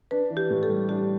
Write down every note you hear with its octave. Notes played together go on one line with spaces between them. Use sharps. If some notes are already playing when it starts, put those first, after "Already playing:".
D4 B4
E3
G4
A2
A4
G3
D4 G4